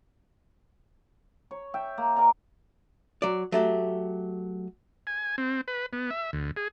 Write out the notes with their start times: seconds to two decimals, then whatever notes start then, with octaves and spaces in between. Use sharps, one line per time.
1.51 C#5
1.74 E5 G5
1.98 A#3
2.16 A#4 D5 G#5 A#5
3.22 F#3 D5
3.52 F#3 A3 G4
5.07 G#5
5.38 C4
5.68 B4
5.93 B3
6.11 E5
6.33 D2
6.56 G#4